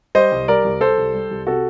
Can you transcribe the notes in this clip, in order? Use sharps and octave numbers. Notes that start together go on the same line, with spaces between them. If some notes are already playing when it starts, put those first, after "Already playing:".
G3 C5 D#5
C2
G3 A#4 D5
C2
G3 A4 C5
C2
G3
C2
C3 F#4 A4